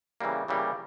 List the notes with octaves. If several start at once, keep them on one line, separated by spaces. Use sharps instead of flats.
C#3 E3 G3 A#3
C#3 E3 G3 A#3